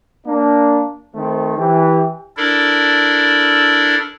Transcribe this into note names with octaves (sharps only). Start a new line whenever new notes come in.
A#3 D4
D#3 A3 C4
E3 G4
D4 E4 A4 A#4 D5